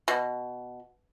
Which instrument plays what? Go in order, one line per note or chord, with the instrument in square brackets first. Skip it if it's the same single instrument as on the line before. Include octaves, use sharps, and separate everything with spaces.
[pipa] B2